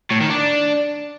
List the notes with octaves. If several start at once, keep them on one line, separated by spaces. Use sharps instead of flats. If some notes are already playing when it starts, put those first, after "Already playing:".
A2
D#3
D4